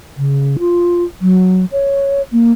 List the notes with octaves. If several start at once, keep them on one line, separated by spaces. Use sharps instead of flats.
C#3
F4
F#3
C#5
A#3